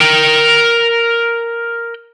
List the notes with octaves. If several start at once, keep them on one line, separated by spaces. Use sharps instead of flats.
A#4 G5